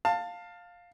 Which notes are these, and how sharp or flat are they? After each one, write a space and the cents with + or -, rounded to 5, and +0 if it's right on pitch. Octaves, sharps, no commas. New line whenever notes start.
F5 +10 A5 +20